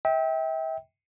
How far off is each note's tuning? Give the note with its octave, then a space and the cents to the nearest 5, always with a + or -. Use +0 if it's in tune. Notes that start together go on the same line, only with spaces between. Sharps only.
E5 -35 G5 +0